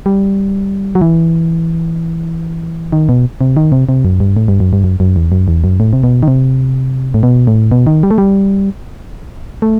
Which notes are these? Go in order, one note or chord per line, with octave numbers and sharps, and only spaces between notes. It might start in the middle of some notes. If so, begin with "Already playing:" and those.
G3
F#3
E3
D#3
B2
C3
D#3
C3
C3
F#2
G2
A2
G2
F#2
G2
F#2
F#2
E2
F#2
E2
F#2
A2
C3
B2
D#3
C3
A2
B2
A2
B2
D#3
G3
A3
G3
A3